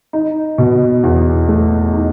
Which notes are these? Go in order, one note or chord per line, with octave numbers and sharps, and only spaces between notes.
D#4
B2
E2
A3
D#4